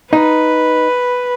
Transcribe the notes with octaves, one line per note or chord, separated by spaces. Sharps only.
D#4 B4